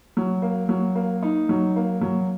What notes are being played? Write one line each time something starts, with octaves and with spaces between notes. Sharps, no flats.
F#3
A#3
F#3
A#3
D#4
F#3
A#3
F#3